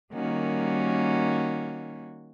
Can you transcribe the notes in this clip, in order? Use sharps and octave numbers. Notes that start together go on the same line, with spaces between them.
D#3 G3 A#3 C#4 F#4